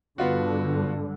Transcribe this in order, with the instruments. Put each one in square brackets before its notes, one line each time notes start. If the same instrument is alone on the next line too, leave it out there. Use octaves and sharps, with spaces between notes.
[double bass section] G2 D3 [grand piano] B3 F4 F#4